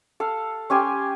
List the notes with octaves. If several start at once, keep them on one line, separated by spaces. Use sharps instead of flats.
A4 F5
C#4 G4 G#5 C6